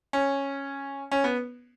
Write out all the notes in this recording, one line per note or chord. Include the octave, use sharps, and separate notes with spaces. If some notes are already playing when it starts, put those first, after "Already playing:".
C#4
C#4
B3